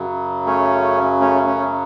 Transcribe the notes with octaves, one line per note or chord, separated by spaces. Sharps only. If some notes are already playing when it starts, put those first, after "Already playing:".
Already playing: F#2 C#3 F#3
A3 C#4
A3 C#4
A3 C#4